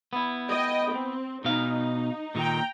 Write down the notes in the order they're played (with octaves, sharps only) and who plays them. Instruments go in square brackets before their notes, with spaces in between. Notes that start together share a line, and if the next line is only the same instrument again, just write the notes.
[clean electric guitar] B3 E4
[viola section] D#5 G5
C4
[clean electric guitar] B2 F5 [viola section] D#4
[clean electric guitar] A#2 D#3 [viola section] G5 A#5